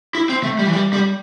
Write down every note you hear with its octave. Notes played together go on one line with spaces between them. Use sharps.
E4
C4
A3
G3
E3
G3
G3